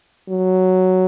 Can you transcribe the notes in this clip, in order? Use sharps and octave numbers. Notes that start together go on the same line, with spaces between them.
F#3